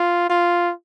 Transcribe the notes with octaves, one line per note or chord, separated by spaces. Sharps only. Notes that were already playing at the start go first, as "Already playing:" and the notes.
Already playing: F4
F4